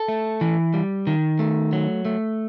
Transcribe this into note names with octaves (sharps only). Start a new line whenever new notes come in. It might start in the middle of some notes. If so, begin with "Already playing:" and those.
Already playing: A4
A3
E3
G3
D#3
A3
F#3
A3